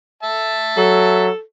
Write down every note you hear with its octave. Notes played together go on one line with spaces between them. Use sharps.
E5 A5
F#3 A4